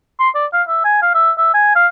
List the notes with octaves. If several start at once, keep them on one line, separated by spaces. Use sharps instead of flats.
C6
D5
F5
E5
G#5
F5
E5
E5
G#5
F5